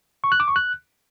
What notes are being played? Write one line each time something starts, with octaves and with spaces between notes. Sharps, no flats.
C#6
F#6
D6
C#6
F#6